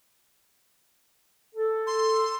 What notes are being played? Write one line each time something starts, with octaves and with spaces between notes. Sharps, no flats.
A4
C6